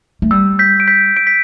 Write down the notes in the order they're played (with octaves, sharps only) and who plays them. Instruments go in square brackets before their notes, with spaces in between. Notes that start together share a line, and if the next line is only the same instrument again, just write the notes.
[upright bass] A3
[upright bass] G3 [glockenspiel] E6
[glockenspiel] G6 B6
D7
G6 B6
D7
B6